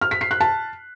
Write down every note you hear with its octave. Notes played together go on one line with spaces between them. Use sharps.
F6
B6
C7
F#6
A5